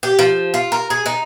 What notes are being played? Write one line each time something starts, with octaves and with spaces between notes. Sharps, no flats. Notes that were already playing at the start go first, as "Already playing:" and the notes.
G4
F3
F4
A#4
G#4
D#4